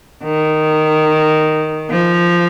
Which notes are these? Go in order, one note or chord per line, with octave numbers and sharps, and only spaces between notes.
D#3
F3